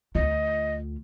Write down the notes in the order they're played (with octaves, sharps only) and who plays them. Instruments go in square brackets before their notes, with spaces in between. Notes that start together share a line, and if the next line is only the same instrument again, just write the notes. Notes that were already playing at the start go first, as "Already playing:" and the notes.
[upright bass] D2 F4 [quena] D#5